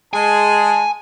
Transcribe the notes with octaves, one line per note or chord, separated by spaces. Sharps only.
G#3 G#4 G#5 A5